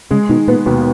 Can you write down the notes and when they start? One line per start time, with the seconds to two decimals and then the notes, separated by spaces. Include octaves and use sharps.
0.11 C#3 G#3
0.29 B2 D#3
0.48 A#2 B3
0.66 D#2 B2